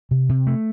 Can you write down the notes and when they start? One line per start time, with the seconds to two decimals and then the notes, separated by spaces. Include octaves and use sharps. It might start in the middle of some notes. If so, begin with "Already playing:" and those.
0.11 C3
0.29 C3
0.47 A3